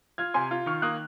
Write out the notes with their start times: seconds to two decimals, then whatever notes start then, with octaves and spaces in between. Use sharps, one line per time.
0.18 F4 F6 G#6
0.34 C3 G#5 C6
0.51 F4
0.66 D#3 C#6 F6
0.82 A#3 D#6 F#6